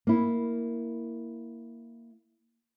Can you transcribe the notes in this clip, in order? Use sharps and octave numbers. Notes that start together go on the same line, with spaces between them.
A#3 E4